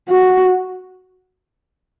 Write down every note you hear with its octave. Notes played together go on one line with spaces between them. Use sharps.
F#4